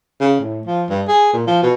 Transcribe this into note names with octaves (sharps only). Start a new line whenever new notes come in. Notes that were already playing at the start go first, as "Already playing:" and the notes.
C#3
A2
F3
G2
G#4
A#2
F3
B2